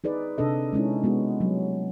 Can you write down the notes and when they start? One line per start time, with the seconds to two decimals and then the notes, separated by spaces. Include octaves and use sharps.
0.04 D#4 G#4 B4 D5
0.38 C3 D4 A4 D#5
0.73 G#3 C#4 D#4 E4
1.04 G#3 B3 F#4
1.41 F#3 G3